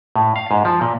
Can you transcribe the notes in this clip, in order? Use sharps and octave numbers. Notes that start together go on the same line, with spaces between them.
A2
F5
G#2
F3
A#2